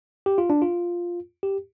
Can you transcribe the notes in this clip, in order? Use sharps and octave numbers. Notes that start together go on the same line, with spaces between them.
G4
F4
D4
F4
G4